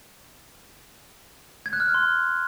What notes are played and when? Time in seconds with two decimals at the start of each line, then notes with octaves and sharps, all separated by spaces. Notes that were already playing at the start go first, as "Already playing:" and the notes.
1.66 G#6
1.73 F#6
1.80 F6
1.87 F#6
1.94 C6